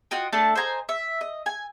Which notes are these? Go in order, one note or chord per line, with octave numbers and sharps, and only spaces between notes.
F4 F#4 D#5 G5
A3 D4 A5
C5 D#5 G#5 A#5
E5
D#5
G#5